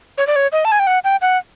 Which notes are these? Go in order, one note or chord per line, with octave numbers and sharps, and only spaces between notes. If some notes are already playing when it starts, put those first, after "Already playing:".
C#5
D5
C#5
D#5
A5
G#5
G5
F#5
G5
F#5